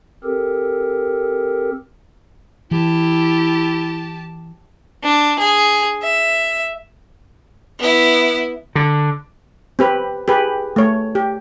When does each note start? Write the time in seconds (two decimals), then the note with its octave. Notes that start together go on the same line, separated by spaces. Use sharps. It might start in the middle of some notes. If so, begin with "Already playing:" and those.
0.24 C4 G4 A4 A#4
2.71 E3 E4 G4 A5
5.04 D4
5.40 G#4
6.03 E5
7.79 B3 E4
8.75 D3
9.79 C4 G4 B4
10.28 G4 G#4 B4
10.76 A3 C#5
11.15 G4